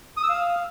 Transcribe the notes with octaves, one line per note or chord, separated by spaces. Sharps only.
D#6
E6
F5